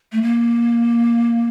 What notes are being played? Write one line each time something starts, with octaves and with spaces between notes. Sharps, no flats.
A3
A#3